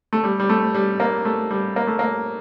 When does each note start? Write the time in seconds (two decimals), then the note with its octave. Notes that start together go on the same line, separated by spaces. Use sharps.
0.13 A3
0.24 G3
0.40 G3
0.49 A3
0.74 G3
1.00 A#3
1.25 A3
1.51 G3
1.76 A#3
1.87 A3
1.99 A#3